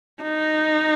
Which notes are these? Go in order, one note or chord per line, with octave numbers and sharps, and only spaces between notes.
D#4